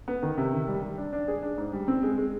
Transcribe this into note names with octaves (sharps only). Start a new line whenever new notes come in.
B3
D#3
C3
D#3
G3
G3
D4
D4
G#4
D4
G#2
G3
C4
G#3
G#3